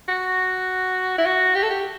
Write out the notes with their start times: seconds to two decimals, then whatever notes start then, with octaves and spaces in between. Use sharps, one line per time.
0.09 F#4
1.18 E4
1.26 F#4
1.55 G4
1.63 A4
1.70 G4